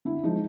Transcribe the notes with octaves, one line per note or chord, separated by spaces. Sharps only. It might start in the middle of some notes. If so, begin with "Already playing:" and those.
D3 E4
F3 G#3 D#4